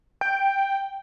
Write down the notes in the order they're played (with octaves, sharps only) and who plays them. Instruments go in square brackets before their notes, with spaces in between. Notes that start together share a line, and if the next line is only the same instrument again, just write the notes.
[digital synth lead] G5